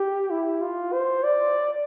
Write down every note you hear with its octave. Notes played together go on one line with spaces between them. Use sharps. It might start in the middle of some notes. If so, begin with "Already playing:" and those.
Already playing: G4
E4
F4
C5
D5